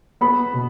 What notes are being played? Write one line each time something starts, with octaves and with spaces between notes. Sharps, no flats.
B3 B5
B2